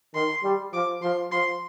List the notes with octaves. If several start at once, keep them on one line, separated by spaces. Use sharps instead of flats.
D#3 C6
G3
F3 D6
F3 C6
F3 C6